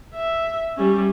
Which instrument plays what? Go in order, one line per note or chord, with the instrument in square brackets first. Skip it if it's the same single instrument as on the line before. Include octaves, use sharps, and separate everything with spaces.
[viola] E5
G3 C#4